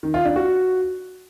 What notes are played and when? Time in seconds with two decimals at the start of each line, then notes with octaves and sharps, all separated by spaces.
0.03 D#3
0.14 F4
0.25 D4
0.36 F#4